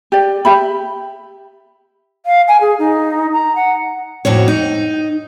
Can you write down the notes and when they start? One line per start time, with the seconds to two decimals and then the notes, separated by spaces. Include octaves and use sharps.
0.12 G4 D5
0.45 G4 E5 B5
2.26 F5
2.48 G#5
2.61 G#4
2.79 D#4
3.32 A#5
3.56 F#5
4.25 F2 A2 F#4 C#5
4.48 D#4